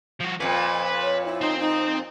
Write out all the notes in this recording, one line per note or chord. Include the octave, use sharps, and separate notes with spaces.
F3 F#4
F2 A#2 B4
C#5
E4
C4 D#4 C5
D#4